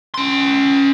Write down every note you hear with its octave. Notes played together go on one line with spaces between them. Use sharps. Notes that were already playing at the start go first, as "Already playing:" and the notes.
C#4 C6